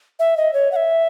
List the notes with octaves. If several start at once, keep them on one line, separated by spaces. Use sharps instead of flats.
E5
D#5
C#5
F#5
E5